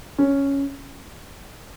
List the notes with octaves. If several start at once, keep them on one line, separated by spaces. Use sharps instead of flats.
C#4